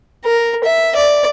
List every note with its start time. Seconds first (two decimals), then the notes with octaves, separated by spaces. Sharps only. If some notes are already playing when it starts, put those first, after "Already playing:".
0.25 A#4
0.64 E5
0.96 D5